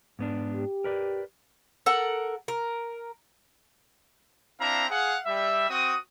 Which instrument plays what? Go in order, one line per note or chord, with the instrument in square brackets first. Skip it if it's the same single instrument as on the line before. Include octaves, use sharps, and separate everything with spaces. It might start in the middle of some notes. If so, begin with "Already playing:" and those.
[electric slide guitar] G#2 B3 D4
[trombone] G4
[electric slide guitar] A#4 B4 D5
[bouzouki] A4 A#4 F#5
A#4
[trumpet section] C4 D4 E4 F5 A#5
G#4 F5 F#5
G3 E5
C4 F#4 D#6